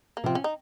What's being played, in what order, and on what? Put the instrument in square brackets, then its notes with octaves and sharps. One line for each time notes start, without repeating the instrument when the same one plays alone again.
[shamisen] A#3
[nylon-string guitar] C3 F3 [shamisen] C4
[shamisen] C#4
D#4